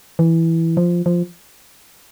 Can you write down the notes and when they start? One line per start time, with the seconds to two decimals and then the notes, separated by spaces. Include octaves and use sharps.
0.19 E3
0.77 F3
1.06 F3